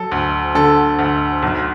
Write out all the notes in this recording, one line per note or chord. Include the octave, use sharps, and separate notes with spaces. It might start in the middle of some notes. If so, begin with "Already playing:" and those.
Already playing: F#3 A4
D2
D3 A4
D2
B1